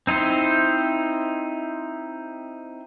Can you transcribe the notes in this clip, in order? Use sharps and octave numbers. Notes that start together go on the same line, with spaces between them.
C4 D#4 E4 C5